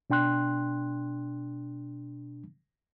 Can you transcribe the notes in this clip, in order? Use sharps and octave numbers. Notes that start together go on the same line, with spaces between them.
B2 D4 G5 C6 F#6